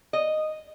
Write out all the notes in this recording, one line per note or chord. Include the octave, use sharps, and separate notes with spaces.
D#5